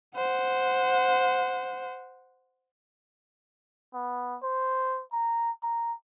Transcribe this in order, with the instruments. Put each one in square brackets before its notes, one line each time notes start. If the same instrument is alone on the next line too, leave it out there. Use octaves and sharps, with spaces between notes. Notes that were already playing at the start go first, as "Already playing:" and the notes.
[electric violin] C5 F#5
[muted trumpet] B3
C5
A#5
A#5